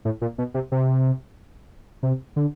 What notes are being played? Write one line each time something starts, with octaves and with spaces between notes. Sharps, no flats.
A2
A#2
B2
C3
C3
C3
D3